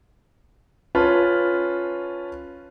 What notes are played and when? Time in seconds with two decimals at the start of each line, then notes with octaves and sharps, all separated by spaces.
0.95 C#4 F4 B4 A5